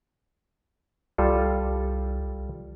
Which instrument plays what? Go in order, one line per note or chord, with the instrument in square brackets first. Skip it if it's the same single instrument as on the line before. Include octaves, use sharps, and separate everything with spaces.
[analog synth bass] C2 [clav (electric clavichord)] G3 F4 A4